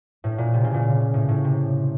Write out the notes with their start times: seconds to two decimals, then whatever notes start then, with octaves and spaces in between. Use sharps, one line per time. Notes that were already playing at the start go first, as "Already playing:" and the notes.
0.24 A2
0.38 A#2
0.54 C3
0.64 C#3
0.74 A#2
1.14 A2
1.29 A2
1.44 C3